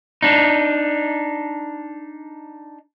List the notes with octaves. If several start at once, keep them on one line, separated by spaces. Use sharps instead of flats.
D4 D#4